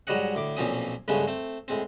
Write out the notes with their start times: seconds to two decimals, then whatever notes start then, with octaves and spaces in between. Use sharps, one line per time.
0.07 G#2 F#3 G3 C#5 D#5 F#5
0.35 D2 A2 D6
0.57 B1 A#2 F3 C4 C#4 D#6
1.08 G2 C#3 G#3 A3 B3 C#4
1.27 A3 C4
1.68 A2 G#3 C4